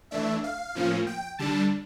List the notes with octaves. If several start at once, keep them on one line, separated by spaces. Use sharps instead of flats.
E3 A3 D4 E5
F5
A2 F3 A#3 C#4
G5
D3 G3 D4 A5